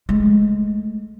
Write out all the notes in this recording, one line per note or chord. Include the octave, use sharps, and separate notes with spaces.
G#3 A3